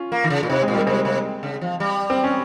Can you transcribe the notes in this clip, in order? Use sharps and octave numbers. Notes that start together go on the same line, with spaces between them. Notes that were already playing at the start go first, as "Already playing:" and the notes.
Already playing: C#4 F4
A#3
D#3
C#3
A#2
C3 C4 D#4
G#3 C4
A#2
G3 A#3
C3 G#3 C4
C3
C#3
F3
G3
C4
C#4